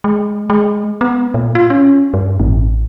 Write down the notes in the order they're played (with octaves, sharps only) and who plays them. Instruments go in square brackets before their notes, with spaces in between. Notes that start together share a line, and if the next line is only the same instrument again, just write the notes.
[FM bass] G#3
G#3
B3
A#2
F4
C#4
G2
A1